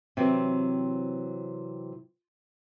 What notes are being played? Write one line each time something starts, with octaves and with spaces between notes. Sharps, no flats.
C3 E3 F#3 C4